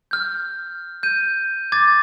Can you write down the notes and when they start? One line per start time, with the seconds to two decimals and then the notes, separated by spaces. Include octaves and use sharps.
0.11 F6 G6
1.03 G6 D#7
1.72 D6 G#6 A6